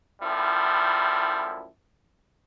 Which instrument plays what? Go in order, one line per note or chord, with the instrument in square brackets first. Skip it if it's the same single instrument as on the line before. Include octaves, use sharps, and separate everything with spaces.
[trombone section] F#2 A2 F3 G3 E4